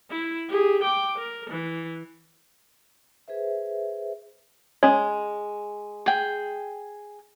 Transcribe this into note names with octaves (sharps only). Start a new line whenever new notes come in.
E4
G4 G#4
G5 D6
A#4
E3
G#4 B4 C5 E5
G#3 C#4 C#5
G#4 G5